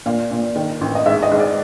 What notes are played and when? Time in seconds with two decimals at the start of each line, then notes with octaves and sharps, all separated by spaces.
0.06 A#2 F5
0.31 A#2
0.56 D#3
0.81 A1
0.95 D#5
1.06 G#2 E5
1.23 D#5
1.31 G#2
1.40 D5